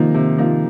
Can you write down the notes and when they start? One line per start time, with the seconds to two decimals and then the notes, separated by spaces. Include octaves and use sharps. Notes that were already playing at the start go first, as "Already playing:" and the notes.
Already playing: C3 D#3 F3 A#3 D#4
0.14 C3
0.38 F3 A#3 D#4